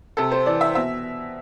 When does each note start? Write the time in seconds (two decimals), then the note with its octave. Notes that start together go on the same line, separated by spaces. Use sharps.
0.17 C3 A4
0.31 C5
0.46 E3 D5
0.61 E5
0.75 B2 E5